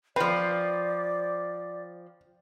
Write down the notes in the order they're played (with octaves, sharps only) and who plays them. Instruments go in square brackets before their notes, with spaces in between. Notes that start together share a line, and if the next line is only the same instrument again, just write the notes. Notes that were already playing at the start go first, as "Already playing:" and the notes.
[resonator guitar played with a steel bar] F3 C4 [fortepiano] B4 [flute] D5